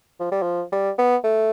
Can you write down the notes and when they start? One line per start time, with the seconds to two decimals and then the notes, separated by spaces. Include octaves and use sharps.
0.20 F3
0.32 G3
0.42 F3
0.72 G3
0.98 B3
1.24 A3